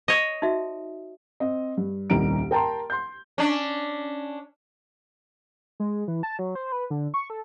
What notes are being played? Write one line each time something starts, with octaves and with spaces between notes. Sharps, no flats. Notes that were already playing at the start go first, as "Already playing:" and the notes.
C#5 D#5
D#4 F#4 E5
C4 D#5
G2
D#1 C2 D#3 G3 A#5 D7
A#4 G5 A5 A#5 C6
C6 G6
C#4 D4
G#3
E3
A5
F#3
C5
B4
D3
C#6
A4